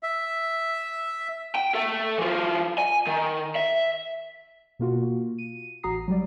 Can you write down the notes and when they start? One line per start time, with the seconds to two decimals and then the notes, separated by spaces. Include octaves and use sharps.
0.03 E5
1.55 G5
1.74 A4 E5
2.18 E3 F4
2.79 G#5
3.07 D#3
3.55 E5
4.79 B2 A#3 F4 F#4
5.38 D#7
5.83 A1 F#4 A#5 D#6 C7
6.08 F#3 G3 D5